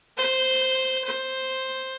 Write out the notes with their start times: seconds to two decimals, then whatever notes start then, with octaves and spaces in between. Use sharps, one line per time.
0.17 C5
1.04 C5